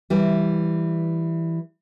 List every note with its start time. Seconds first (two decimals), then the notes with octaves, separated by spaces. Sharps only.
0.10 E3 G3